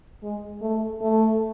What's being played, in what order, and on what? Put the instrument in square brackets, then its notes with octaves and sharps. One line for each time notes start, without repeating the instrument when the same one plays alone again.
[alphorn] G#3
A3
A3